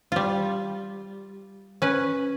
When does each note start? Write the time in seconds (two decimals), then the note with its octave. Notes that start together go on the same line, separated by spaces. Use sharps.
0.12 G3 F4
1.82 C#4 B4